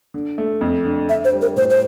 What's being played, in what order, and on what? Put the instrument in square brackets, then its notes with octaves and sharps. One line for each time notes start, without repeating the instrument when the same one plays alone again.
[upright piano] D3
A3
F2
D3
[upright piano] D3 [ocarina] E5
[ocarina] C5
[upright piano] G3
[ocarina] A#4
[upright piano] A2 [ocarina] C5
[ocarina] C5